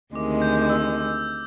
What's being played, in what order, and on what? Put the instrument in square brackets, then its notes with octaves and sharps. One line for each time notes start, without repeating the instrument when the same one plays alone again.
[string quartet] D2 C3 D#3 G#3 [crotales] D6
[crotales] G6
G6
E6